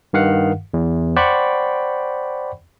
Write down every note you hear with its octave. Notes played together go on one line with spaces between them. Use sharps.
G2 D#3 F5 F#5
E2
C5 D5 F#5 G5 B5 C#6